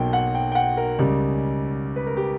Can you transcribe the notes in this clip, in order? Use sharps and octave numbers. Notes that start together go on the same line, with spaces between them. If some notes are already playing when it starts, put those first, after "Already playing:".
Already playing: B1 B2 F#3 A#3 G5
F#5
G5
G5
F#5
A#4
C#2 C#3 G3
B4
A#4
G4